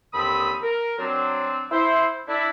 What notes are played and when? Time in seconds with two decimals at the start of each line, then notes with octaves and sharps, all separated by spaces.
0.13 D#2 D3 C4 B5 D#6
0.62 A#4
0.98 F#3 C4 D4
1.71 E4 C5
2.26 D4 E4